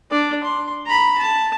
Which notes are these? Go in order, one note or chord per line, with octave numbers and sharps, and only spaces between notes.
D4 D5
C6
A#5 B5
A5